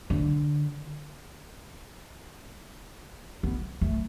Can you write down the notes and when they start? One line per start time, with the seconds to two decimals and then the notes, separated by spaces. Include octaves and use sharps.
0.10 D3
3.43 B3
3.81 A3